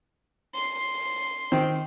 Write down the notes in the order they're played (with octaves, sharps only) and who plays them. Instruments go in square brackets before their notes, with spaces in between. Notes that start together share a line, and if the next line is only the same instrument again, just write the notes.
[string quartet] C6
[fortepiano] D#3 C4